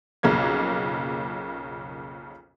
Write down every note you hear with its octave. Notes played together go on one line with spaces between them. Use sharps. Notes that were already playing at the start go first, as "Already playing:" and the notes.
B1 F2 C#3 A#3 G#6